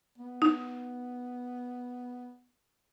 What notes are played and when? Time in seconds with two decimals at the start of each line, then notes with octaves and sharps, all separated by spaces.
0.18 B3
0.42 D#4